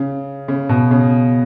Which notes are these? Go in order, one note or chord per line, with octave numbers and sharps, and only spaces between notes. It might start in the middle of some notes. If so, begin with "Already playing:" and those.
Already playing: C#3
C#3
B2
C#3